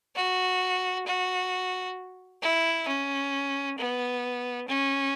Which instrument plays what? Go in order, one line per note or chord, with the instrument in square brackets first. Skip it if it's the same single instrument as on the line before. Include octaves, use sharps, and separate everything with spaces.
[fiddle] F#4
F#4
E4
C#4
B3
C#4